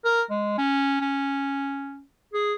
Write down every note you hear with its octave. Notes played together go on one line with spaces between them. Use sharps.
A#4
G#3
C#4
C#4
G#4